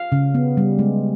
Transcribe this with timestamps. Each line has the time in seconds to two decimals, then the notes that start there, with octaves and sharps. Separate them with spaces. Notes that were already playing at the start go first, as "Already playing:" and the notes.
Already playing: F5
0.12 C#3
0.35 B3
0.57 G3
0.79 G#3